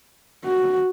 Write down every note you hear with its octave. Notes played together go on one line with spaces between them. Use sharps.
F#4